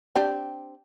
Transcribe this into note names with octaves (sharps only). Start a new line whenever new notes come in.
C4 D4 G4